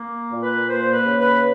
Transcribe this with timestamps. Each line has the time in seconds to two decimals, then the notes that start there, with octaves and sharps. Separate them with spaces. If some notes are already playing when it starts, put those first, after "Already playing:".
Already playing: A#3
0.31 A#2
0.43 B4
0.68 A#3 C5
0.92 B4
1.06 C#3
1.18 B4